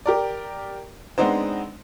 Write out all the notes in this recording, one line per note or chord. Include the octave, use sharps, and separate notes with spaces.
G4 A#4 D5
G#3 B3 C4 D4 D#4 C5